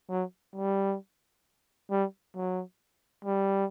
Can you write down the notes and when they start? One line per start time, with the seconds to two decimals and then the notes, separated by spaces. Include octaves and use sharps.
0.10 F#3
0.56 G3
1.91 G3
2.36 F#3
3.25 G3